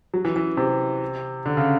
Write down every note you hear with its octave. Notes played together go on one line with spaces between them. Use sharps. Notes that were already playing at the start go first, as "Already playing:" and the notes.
F#3
E3
E3
C3
D3
C#3